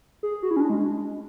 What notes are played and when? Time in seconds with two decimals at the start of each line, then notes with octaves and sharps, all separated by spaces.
0.23 G#4
0.43 F#4
0.51 E4
0.56 C#4
0.61 D4
0.70 G#3